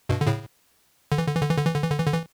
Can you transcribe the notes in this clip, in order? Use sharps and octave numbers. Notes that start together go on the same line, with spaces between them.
G2 B2
D3
A2 C#3
D3
E3
D3
E3
D3
E3
D3
E3
D3
E3
D3
E3
D3
E3